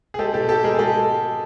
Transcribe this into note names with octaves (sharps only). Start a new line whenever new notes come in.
G#4
G#3 G4 A4
B2 G4 A4
B2 G4 A4
G#3 G#4 A#4
G#3 G4 A4